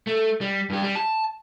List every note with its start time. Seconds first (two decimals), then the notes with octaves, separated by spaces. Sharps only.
0.07 A3
0.41 G3
0.70 G2 G4
0.82 G3
0.95 A5